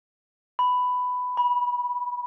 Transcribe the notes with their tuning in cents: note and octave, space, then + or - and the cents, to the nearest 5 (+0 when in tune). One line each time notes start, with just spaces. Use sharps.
B5 +10
B5 -20